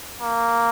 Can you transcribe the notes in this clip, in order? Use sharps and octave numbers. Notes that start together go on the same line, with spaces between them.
A#3